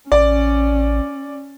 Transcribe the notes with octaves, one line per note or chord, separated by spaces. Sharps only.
A1 C#4 D5